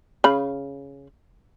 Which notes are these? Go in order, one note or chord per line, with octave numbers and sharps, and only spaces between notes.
C#3 B5